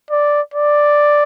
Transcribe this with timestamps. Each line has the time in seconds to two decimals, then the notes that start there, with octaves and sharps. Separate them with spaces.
0.11 D5
0.54 D5